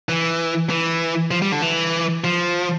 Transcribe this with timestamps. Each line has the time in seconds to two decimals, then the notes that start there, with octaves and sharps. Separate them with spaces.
0.09 E3
0.70 E3
1.31 F3
1.42 G3
1.52 D3
1.62 E3
2.24 F3